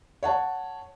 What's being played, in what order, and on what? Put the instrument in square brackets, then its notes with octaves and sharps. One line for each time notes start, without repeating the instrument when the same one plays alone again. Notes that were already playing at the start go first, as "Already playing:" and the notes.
[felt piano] C#5 F#5 A5